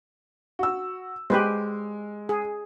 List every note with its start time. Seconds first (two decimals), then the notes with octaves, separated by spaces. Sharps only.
0.59 F#4 E6
1.30 G#3 G4 B4 C5
2.29 G#4